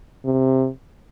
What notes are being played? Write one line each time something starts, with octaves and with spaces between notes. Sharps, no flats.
C3